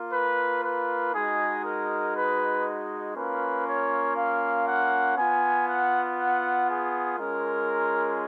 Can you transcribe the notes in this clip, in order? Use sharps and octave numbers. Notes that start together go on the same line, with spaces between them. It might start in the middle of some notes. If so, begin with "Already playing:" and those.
Already playing: A#3 F4
B4
B4
G#3 D#4 F#4 G#4
A#4
B4
A#3 C#4 F4 B4
C#5
F5
F#5
B3 F4 G#5
F#5
F#5
G#4
G#3 C#4 F4 A#4